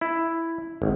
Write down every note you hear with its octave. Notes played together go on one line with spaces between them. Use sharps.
E4
G#1